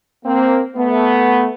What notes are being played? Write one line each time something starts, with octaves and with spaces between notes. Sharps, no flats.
A#3 C4
A3 B3